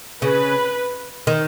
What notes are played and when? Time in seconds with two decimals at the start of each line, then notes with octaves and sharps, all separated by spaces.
0.22 C#3 B4
1.27 D#3